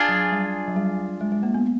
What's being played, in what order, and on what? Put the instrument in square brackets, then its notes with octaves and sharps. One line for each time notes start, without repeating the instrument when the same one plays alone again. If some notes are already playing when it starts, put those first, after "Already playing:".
Already playing: [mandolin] D4 F4 G#4
[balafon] F#3
G3
F#3
G3
G#3
G#3
A#3
B3